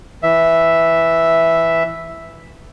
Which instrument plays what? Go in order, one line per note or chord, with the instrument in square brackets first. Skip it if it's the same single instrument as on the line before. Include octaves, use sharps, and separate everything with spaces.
[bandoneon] E3 E5